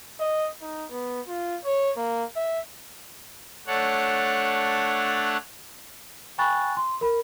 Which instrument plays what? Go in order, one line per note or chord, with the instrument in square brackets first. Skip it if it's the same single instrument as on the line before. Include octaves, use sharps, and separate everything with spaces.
[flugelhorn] D#5
D#4
B3
F4
C#5
A#3
E5
[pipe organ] A3 D4 C#5 F#5
[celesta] G5 G#5 B5 C#6 F#6 A6
C6
A#4 B5